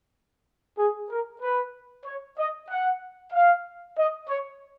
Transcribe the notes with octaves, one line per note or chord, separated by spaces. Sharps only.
G#4
A#4
B4
C#5
D#5
F#5
F5
D#5
C#5